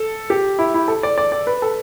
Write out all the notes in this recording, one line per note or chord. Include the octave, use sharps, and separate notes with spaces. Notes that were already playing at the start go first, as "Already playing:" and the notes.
Already playing: A4
G4
E4
E4
A4
D5
D5
D5
B4
A4